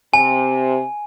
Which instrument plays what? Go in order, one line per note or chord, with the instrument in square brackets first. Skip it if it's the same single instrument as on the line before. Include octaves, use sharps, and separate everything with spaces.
[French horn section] C3 [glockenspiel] G#5